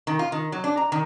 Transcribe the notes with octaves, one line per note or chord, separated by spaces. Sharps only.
D#3
F4
D#3
F#3
D4
A#5
D#3